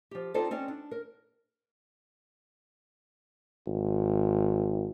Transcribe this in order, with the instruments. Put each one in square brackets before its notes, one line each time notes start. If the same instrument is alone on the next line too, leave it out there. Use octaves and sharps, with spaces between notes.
[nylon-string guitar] F3 G4
C4 D#4 F4 A4 C5 D5
C4 C#4 D#4 D5
D4
A#4
[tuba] G#1